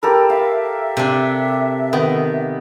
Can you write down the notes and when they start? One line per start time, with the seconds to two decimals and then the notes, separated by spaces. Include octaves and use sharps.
0.03 G4 A4 A#4 B5
0.30 E5 F5
0.97 C3 D4
1.93 D#3 B3